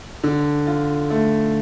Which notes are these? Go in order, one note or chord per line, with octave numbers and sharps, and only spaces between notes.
D3
F4
A3